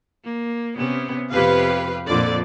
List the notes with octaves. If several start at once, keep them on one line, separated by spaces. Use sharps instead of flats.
A#3
C3 B3 C#4
F2 C3 G4 B4 F5
F2 A#2 D3 F4 D5